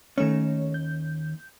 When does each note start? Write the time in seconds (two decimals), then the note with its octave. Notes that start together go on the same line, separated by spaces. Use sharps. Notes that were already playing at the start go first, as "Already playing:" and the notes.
0.18 D#2 D#3 A3 C#4 C#5
0.74 G6